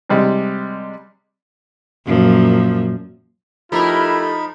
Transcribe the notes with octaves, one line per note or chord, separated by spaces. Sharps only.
C3 G3 G#3
F#2 A#2 F3
F3 A3 D#4 E4 G4 A#4 B5